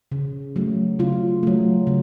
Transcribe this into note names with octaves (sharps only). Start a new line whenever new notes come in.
C#3
F#3 A3
C#3 F4
F#3 A3
C#3